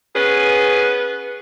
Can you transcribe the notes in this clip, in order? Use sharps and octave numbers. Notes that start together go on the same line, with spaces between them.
B3 C#4 G#4 B4